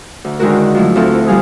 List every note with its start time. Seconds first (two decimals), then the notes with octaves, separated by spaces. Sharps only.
0.25 D2
0.39 D3 D#3 G#3 E4 F#4 A#4
0.75 F3 F#3 A3 E4
0.96 D2 C4 E4 F4 A4
1.12 E4
1.26 F3 G3 F5 G#5 D#6